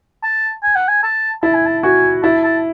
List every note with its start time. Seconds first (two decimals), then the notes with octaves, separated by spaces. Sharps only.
0.23 A5
0.63 G#5
0.76 F#5
0.88 G#5
1.03 A5
1.43 E4 A5
1.55 G#5
1.66 A5
1.83 F#4 G#5
2.23 E4 A5
2.44 A5